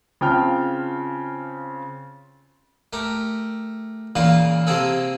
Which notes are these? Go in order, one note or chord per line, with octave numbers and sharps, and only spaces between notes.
C#3 C4 F4 G5 A5 F6
A3 G4 A#4
A#2 C#3 E3 A#3 F4 F5
C3 A#3 C4 G#4 A4